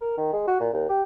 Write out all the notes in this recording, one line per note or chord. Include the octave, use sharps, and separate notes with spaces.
A#4
D#3
G#3
F#4
A#2
D#2
G4